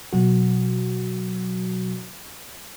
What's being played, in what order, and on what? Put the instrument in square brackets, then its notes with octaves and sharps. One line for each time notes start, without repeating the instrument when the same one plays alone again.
[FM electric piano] B2 F#3 F#4